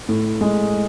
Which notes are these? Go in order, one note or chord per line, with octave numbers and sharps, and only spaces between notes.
A2
G#3